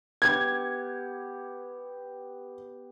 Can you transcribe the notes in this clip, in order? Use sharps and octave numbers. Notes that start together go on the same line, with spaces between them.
B3 G4 G#6